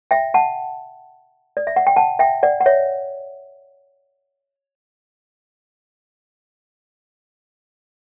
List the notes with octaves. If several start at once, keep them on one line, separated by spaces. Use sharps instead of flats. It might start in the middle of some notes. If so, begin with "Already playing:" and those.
E5 G5
F#5 A5
D5
E5
F#5
G5
F#5 A5
E5 G5
D5 F#5
F#5
C#5 E5